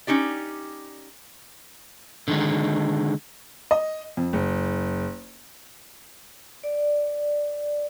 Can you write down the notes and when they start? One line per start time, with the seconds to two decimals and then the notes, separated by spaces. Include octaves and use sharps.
0.07 C#4 D#4 G4 D5
2.28 D3 D#3 G#3
3.71 D#5
4.17 F2
4.33 F#1
6.64 D5